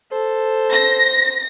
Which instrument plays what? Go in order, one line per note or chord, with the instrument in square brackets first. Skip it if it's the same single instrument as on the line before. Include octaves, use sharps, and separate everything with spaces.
[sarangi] A4 [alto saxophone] C5
[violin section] A#6